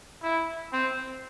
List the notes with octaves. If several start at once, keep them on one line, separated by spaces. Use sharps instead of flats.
E4
C4